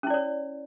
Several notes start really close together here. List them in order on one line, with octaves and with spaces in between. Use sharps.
C#4 E4 D5 C#5